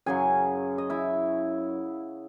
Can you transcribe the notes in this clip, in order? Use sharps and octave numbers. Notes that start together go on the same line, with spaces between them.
F#2 C#3 F#3 G#4 G#5
D#5
E4 E5